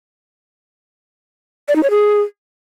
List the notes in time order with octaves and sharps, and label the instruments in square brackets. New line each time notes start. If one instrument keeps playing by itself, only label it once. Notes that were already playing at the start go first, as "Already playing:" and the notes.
[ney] D5
D#4
C#5
G#4